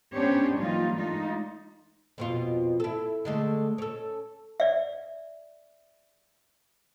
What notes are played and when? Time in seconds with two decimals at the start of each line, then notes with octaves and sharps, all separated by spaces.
0.13 B3 C#4 D4 G4 C5 C#5
0.57 E3 F#3 G3 A#3 D#4 F4
0.96 G#3 A3 D4 D#4 F4
2.18 F2 B2 F4
2.80 E4 A4
3.25 D3 G#3 A3
3.78 C#4 A4
4.60 D5 E5